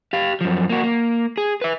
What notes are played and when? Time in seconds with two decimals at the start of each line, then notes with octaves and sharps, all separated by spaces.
0.13 G4 F5
0.41 F#2 F3
0.70 A#3 F#4
0.83 A#3
1.37 G#4
1.61 B4 E5